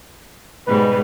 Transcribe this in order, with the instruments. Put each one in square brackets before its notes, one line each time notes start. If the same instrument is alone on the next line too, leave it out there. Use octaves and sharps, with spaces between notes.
[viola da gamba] G#2 B2 G3 [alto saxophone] B4